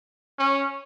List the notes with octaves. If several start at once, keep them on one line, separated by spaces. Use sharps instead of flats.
C#4